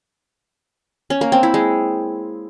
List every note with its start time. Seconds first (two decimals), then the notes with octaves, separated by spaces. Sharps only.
1.10 C#4
1.21 A#3
1.32 C4
1.43 E4
1.54 G#3